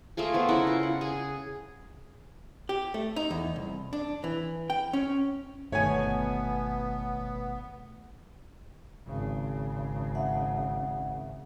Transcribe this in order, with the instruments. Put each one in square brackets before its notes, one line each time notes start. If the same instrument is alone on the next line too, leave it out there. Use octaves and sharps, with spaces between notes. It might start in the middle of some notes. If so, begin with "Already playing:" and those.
[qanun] A3 A#3 F4 G#4
F3 B3
C#3 E4 A#4 F#5
F4
F#5
G#4
[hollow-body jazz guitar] G4
A3
D#4
E2
C2
D4
E3
G5
C#4
[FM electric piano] G1 [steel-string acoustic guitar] B2 D#3 A3 [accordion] B3 [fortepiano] C#5 G#5
[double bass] G#1 C#3
[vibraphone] E5 F#5